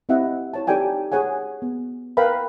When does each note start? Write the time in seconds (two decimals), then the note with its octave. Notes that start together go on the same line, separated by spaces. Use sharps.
0.09 C4 E4 G4 D#5 E5 F#5
0.54 E4 C#5 A5
0.67 D#4 G4 A4 D5 G5 G#5
1.12 G#4 C#5 F#5 G#5
1.62 B3
2.17 A#4 B4 F5 G5 B5